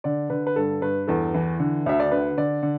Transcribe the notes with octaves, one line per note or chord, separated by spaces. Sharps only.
D3 D5
D3 B4
B4
G2 A4
G2 B4
E2 A4
E3
D3
D2 E5
D5
D3 B4
D3 D5
D3